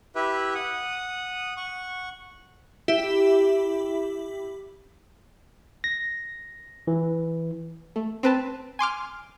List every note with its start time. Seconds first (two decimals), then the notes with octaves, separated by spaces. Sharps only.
0.15 E4 G4 B4 E5
0.55 F#5 D#6
1.57 F#5 C#6
2.88 E4 G4 E5
5.84 A#6
6.87 E3
7.96 A3
8.23 C4 B4 A5
8.79 G#5 C6 D6 F6